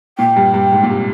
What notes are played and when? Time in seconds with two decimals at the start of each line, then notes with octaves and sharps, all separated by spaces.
0.19 A#2 G5
0.36 G2
0.54 G2
0.72 G#2
0.83 A#2
0.90 C3